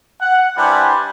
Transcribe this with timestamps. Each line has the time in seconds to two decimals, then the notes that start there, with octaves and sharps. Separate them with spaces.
0.22 F#5
0.58 G3 D4 E4 B4 C5 G#5